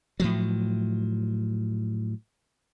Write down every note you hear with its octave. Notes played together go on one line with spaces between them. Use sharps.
A2 F3 F#3